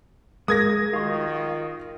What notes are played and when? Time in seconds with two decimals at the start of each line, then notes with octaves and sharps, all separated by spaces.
0.48 G#3 G#4 A#4 D#6 G#6 A#6
0.93 D#3 F4 F#4 F5 C#6